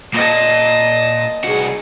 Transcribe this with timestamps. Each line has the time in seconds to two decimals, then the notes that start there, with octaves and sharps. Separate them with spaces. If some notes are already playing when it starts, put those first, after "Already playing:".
0.14 A#2 D#5 A5
1.44 C2 F#4 G#4